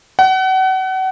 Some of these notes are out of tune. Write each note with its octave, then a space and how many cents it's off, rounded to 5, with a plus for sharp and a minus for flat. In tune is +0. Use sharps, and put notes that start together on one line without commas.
F#5 +35